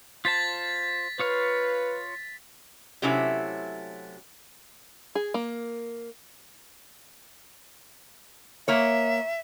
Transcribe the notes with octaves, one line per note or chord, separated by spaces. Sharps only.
F4 C5 A5 A6 B6
F4 B4 C#5 F5
C3 F#3 A3 C#4 E4 E5
G#4
A#3
A#3 C#5 E5